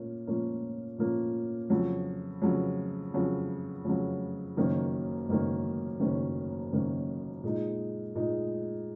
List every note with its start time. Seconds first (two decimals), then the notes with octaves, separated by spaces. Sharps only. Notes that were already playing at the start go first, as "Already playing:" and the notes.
Already playing: A#2 A#3 C#4
0.27 A#2 F3 A#3 C#4
0.98 A#2 F3 A#3 C#4
1.70 F2 C#3 F#3
2.42 F2 C#3 F#3
3.14 F2 C#3 F#3
3.85 F2 C#3 F#3
4.57 F#1 F#2 D#3 A#3 C#4
5.28 F#1 F#2 D#3 A#3 C#4
6.00 F#1 F#2 D#3 A#3 C#4
6.72 F#1 F#2 D#3 A#3 C#4
7.43 A#2 G#3 D#4
8.15 A#2 G#3 D#4